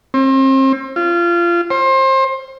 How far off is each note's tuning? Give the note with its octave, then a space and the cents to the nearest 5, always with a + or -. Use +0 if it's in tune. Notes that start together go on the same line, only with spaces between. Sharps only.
C4 +35
F4 -25
C5 +25